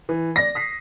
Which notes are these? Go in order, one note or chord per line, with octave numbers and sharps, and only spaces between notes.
E3
D5 A#6
D#6 B6 C7